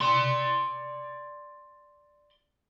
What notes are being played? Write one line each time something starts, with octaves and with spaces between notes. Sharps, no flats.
D5 C6